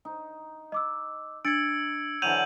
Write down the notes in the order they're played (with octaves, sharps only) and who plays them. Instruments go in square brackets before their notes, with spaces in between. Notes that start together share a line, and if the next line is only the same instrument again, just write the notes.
[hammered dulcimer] D#4
[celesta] D#5 D6 E6
[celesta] D4 A6 [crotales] E6 [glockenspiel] G#6 C#7 D7
[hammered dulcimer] D3 E3 F#3 [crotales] G6 D#7 F#7 [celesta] F7